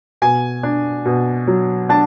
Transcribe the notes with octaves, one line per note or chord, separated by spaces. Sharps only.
B2 G#5
D4
B2
F#3
D4 A5